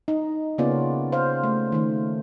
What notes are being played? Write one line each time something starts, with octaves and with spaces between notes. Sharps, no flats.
D#4
C#3 A#3 B3 C#4 F4 D5
C5 F5
A3
D#3 A3